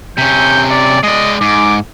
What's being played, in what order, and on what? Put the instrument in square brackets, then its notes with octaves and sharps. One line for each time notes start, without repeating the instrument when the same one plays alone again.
[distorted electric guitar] C3 C#4 [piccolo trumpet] G6
[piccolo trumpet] D5
[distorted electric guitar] G#3 D5 [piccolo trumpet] D#5
[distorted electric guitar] G#2 [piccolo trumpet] D6